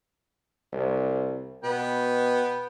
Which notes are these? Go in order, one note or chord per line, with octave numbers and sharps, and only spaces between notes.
C2
B2 B3 G5